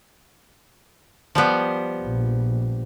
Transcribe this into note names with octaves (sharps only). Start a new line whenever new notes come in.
F3 G3 B3
A#1